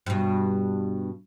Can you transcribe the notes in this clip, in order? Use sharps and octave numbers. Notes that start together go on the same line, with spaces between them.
G2 B2